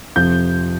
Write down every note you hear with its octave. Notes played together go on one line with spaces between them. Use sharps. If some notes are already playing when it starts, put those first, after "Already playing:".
F2 C3 F3 G6